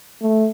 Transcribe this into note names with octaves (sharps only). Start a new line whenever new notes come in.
A3